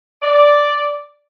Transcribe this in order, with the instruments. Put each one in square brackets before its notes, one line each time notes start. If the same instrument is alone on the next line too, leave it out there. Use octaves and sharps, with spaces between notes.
[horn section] D5